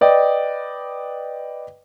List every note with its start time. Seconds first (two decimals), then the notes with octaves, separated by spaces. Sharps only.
0.01 B4 D5 D#5 G5